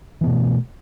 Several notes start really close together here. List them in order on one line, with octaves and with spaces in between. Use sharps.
E3 B3 B2 A3